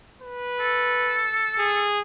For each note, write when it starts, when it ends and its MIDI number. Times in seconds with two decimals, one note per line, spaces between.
0.22 1.30 71
0.60 1.86 69
1.59 2.00 68